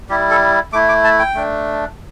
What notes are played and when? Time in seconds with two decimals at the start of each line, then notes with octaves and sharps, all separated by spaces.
0.09 G3 E4 G4
0.30 A4
0.73 A3 E4 D6
0.89 D6
1.04 A5
1.19 G5
1.35 A3 D4